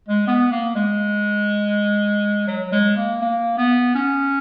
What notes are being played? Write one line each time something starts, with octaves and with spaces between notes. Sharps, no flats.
G#3
B3
A#3
G#3
F#3
G#3
A#3
A#3
B3
C#4